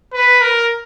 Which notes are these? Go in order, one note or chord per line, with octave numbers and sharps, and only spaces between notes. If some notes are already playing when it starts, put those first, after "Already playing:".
B4
A#4